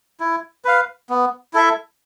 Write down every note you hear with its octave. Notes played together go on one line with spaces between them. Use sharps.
E4
B4 F5
B3
E4 A4 E5